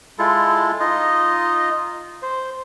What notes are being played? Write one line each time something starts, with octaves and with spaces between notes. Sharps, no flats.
G#3 E4 F4 A4
D#4 F4 D#5
C5